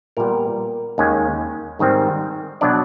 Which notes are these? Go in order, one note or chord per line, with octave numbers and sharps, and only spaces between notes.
A#2 G3 B3 A#4
D#2 D#3 G#3 C#4
G#2 D#3 G3 C4
B2 F#3 B3 D4 D5